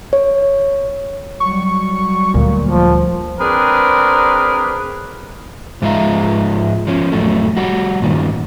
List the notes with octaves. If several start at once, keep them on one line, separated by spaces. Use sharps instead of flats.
C#5
F#3 G3 C#6
D2 A#2
F3
C4 D4 G#4 A#4 B4
G#2 F3 G#3 F4 E5 A#5
F3 C#4
F2 A2 F#3 A3
G3 F#4
G2 A#2 D#3